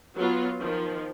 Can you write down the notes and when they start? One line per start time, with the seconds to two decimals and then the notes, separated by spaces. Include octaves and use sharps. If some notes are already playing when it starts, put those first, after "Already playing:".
0.16 F#3 B3 F4
0.60 D#3 F3